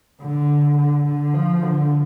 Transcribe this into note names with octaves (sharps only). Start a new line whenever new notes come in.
D3
D3
D3
F3
D3